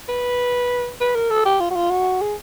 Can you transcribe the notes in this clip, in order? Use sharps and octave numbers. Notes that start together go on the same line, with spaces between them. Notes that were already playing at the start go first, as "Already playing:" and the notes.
B4
B4
A#4
A4
G4
F4
F#4
F4
F#4
G#4